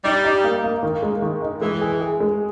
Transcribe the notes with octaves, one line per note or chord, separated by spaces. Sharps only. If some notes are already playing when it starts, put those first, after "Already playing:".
G3 D#4
D#4
A#3
A#3
D#3
G#3
D#3
D#4
E3 G#3
G#4
G#4
G#3